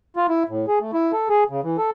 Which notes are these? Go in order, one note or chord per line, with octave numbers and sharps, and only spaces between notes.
F4
E4
A2
G#4
A3
E4
A4
G#4
C#3
E3
A4